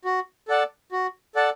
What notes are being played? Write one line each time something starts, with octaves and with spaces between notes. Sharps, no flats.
F#4
A4 D5 F#5 A5
F#4
A4 D5 F#5 A5